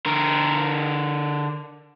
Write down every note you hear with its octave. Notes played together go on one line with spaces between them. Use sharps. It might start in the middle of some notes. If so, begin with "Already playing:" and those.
D3 A#4